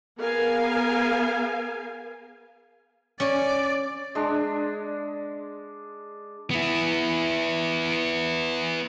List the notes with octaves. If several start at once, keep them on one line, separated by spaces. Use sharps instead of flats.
B3 G#4 A#4 F5 G#5
C#4 C#5 D5
G#3 D4
B3 E4